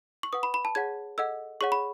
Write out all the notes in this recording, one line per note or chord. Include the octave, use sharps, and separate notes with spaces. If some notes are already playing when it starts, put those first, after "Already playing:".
C#6
B4 F#5 D#6
B5
B5
A5
G#4 C#5 F#5 G#6
A4 D#5 F#5 E6
G#4 C#5 F#5 C#6
B5